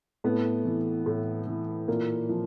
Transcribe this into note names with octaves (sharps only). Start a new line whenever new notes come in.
A2 A3 B3
E3
A2
E3
A#2 A#3
F3